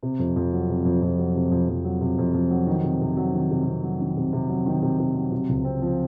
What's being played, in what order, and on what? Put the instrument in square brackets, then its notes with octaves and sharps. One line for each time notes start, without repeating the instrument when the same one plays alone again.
[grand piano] C3
F2
F2
F#3
C3
F2
F2
F#3
C3
F2
F2
F#3
C3
F2
F2
F#3
D#3
C3
C3
F#3
D#3
C3
C3
F#3
D#3
C3
C3
F#3
D#3
C3
C3
F#3
C3
C#2
C4
F3